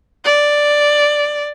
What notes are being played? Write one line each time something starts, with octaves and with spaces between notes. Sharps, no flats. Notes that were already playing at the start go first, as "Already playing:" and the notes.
D5